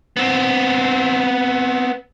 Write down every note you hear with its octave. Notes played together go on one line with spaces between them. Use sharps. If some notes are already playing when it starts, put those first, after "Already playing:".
B3 C4